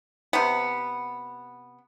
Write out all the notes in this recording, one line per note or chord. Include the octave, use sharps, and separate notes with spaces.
C3 B3